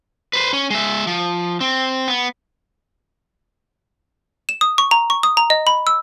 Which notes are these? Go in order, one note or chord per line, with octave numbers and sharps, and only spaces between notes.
B4 C5
C#4
G#3 E5
F3
C4
B3
E7
D#6
C#6
A#5
C#6
D#6
A#5
D#5
B5
E6